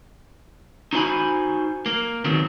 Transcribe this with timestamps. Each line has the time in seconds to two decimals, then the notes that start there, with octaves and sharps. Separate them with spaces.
0.93 D#4 F#4 C5 E5 G#5 B5
1.86 A#3
2.24 D#2 D#3 F#3 B3 C4